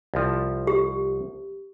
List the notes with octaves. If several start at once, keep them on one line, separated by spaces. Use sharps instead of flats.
C2 F3
G4